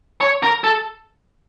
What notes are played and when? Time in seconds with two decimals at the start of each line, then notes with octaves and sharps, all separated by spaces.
0.21 C#5
0.43 A#4
0.64 A4